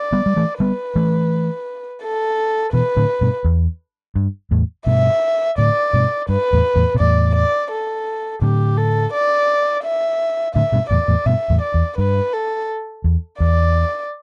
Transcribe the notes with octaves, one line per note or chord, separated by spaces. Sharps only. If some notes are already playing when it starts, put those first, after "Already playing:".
Already playing: D5
G3 B3
G3
E3 A3
G3 B3 B4
E3 A3
A4
B2 E3 B4
A2 D3
G2 B2
E2
G2
E2 A2
G2 B2 E5
A2 D3 D5
G2 B2
G2 B4
E2 A2
E2 A2
B2
E2 A2 D5
D5
A4
A2 D3 G4
A4
D5
E5
A2 D3 E5
G2 B2
E2 A2 D5
E2 A2
G2 B2 E5
E2 A2
D5
E2
G2 B4
A4
E2
E2 D5